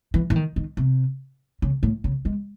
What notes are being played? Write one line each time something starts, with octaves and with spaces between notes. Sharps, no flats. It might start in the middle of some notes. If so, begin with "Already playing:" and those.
E3
E3
D#3
D#3
C3
C#3
A2
C#3
G#3